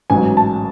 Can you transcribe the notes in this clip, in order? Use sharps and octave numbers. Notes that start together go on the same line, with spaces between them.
A1 G#2 F#3 G#5
A5